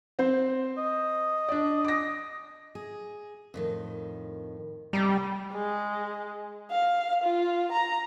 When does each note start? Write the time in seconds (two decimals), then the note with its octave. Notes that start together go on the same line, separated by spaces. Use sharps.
0.19 C4 C5
0.77 D#5
1.48 D4 D5
1.85 D6 A#6
2.75 G#4
3.54 F2 A2 D#3
4.93 C3 G3 D#5 A#5
5.52 G#3
6.71 F5
7.24 F4
7.72 A#5